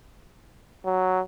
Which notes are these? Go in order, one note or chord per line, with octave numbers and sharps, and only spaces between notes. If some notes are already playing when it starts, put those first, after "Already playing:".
F#3